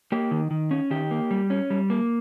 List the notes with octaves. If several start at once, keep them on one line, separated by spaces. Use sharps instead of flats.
A#3 G4
D#3
D#3
C#4
D#3 G4
A#3
G3
C#4
G3
A#3